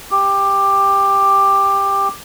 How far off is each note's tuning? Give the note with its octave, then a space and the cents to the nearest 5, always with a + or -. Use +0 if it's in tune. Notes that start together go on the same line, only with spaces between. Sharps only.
G4 +10